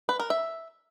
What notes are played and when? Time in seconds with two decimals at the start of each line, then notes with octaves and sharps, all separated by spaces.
0.09 B4
0.20 A#4
0.30 E5